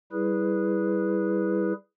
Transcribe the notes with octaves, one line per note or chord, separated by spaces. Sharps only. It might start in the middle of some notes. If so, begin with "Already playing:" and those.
G3 E4 G#4 B4